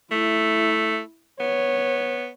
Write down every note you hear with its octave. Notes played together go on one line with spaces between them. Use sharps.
A3 E4
B3 C#5